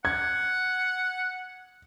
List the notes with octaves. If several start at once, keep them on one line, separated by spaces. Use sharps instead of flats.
F#5 G#6